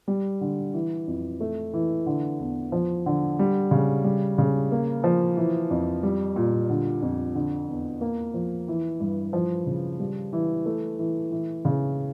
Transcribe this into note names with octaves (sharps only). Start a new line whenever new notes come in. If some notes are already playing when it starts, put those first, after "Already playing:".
G3
D3
E3
F2
A3
E3
D3
E2
F3
D3
G3
C#3
G3
C#3
A#3
F3
E3
F2
G3
A#2
D3
F2
D3
E2
A#3
F3
E3
G2
F3
C#3
G3
E3
A3
E3
E3
C#3